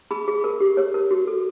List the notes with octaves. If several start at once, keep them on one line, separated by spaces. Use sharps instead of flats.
G#4 B5
G#4
A#4
G4
C#5
A#4
F#4
A4